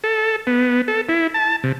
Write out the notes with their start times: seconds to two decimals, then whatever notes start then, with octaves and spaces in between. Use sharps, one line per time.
0.04 A4
0.47 B3
0.88 A4
1.09 E4
1.34 A5
1.64 C3